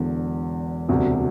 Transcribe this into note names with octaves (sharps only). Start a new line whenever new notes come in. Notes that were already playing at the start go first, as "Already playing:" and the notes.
Already playing: E1 E2 D3
E1 D2 C3